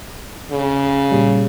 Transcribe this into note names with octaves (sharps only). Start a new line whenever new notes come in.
C#3
A#2 G3